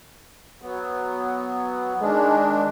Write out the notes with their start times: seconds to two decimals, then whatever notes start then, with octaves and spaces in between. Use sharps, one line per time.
0.62 F#3 B3
2.01 D#3 G#3 D4